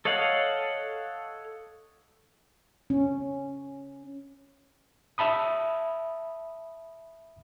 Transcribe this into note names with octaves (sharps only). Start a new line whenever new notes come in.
A4 C#5 D#5 F5 F#5
C#4
E5 A5 B5 D#6